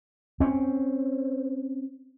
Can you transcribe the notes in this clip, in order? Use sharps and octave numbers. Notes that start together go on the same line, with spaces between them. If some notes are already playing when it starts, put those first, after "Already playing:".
C4 C#4